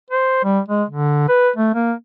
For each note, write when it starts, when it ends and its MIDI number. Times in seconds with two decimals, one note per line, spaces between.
0.10 0.44 72
0.44 0.60 55
0.69 0.84 56
0.89 1.27 50
1.28 1.49 71
1.56 1.73 57
1.74 1.93 58